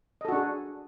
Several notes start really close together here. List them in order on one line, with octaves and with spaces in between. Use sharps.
D#5 A4 F#4 D4 G#4